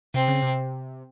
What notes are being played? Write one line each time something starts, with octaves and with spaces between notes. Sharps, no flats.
C3 C4
C#3
C3